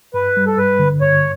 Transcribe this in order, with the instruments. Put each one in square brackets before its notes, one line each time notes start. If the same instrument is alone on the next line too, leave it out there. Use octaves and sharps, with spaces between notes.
[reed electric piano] G2 [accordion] B4
[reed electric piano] G3
[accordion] A4
[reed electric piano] G2 [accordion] B4
[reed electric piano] D3
[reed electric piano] G2 [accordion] C#5